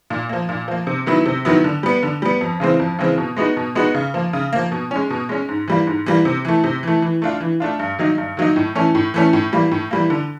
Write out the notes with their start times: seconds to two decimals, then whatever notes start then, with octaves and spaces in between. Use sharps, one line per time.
0.10 A#2
0.29 F3 A#3
0.49 A#2
0.68 F3 A#3
0.87 C3
1.06 D#3 F#3 B3 E4
1.26 C3
1.45 D#3 F#3 B3 E4
1.64 D3
1.83 G3 B3
2.03 D3
2.22 G3 B3
2.41 F2
2.60 C#3 E3 G#3 C4
2.79 F2
2.99 C#3 E3 G#3 C4
3.18 B2
3.37 G#3 B3 D#4 F#4
3.57 B2
3.75 G#3 B3 D#4 F#4
3.95 C#3
4.14 F3 A#3
4.33 C#3
4.53 F3 A#3
4.72 B2
4.91 G#3 C#4
5.10 B2
5.29 G#3 C#4
5.49 G#2
5.68 E3 G3 A#3
5.87 G#2
6.06 E3 G3 A#3
6.25 C3
6.45 E3 A3
6.64 C3
6.83 E3 A3
7.02 E3
7.22 A3 D4 F4
7.40 E3
7.60 A3 D4 F4
7.79 G2
7.99 D#3 F#3 A#3 D#4
8.18 G2
8.37 D#3 F#3 A#3 D#4
8.56 A2
8.75 E3 A3 C#4
8.95 A2
9.14 E3 A3 C#4
9.33 A2
9.52 E3 G3 A#3
9.72 A2
9.91 E3 G3 A#3
10.10 D3